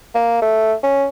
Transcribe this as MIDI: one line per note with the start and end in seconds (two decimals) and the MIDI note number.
0.15 0.40 58
0.42 0.74 57
0.83 1.06 61